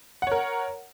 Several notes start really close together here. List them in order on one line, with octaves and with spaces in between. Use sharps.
F#5 C#5 A#4